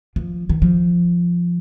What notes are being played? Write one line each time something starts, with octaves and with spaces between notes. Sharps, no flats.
F3
D#3
F3